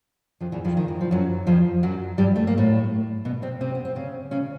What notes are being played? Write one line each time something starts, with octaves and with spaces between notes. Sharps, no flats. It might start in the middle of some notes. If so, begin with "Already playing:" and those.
F2 F3
E2 E3
F2 F3
D#3
E3
F3
F#2 F#3
F2 F3
F#2 F#3
G2 G3
A3
A#3
A2 A3
B2 B3
C3 C4
C3 C4
B3
C4
C#3 C#4
C#3 C#4